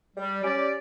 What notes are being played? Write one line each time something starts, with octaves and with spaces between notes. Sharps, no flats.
G3
C#4 G4 D5